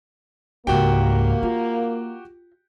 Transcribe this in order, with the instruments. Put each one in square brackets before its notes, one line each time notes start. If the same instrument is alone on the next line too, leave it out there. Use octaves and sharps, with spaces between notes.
[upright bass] C#2 G#2 [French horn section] A#3 [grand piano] F#4 G4 G5
[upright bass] F4